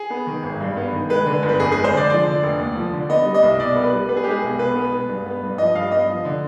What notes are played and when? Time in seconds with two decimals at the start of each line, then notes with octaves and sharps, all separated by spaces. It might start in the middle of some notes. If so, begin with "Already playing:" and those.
Already playing: G#4
0.10 B3
0.27 D#3
0.43 G#1
0.60 G2
0.77 B3
0.93 D#3
1.09 G#3 B4
1.26 D3
1.43 G1
1.49 B4
1.59 F2 G#4
1.72 G#3 G#4
1.84 C5
1.93 D3 D5
2.09 F3 D5
2.26 D3
2.43 F1
2.59 D#2
2.75 F3
2.93 D3
3.09 B3 D#5
3.25 G3
3.34 D#5
3.43 C2
3.59 B2 D5
3.75 B3
3.84 B4
3.92 G3
4.09 B3 B4
4.16 G#4
4.24 G#3 G4
4.30 G#4
4.42 B1
4.59 B2 B4
4.75 B3
4.92 G#3
5.08 G2
5.26 B3
5.42 G2
5.58 F3 D#5
5.75 G2 F5
5.91 B3 D#5
6.08 F3
6.25 D3